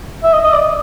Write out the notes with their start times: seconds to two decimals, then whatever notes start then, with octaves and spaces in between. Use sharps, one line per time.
0.24 E5
0.33 D#5
0.44 D#5
0.53 D5